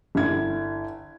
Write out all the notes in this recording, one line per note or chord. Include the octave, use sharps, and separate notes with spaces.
G1 E4 G#6